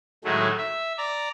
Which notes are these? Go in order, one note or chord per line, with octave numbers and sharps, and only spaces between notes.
A2 D#3 F#3 G#3 A3
E5
D5 A#5